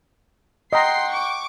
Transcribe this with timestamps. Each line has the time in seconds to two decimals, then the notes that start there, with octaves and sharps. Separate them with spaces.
0.73 D#5 F#5 G5 A#5 C6 C7
1.10 C#6 D6